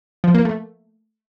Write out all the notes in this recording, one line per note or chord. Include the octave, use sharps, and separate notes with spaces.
F3
A#3
A3